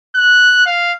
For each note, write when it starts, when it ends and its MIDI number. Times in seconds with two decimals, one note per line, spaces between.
0.15 0.63 90
0.66 0.92 77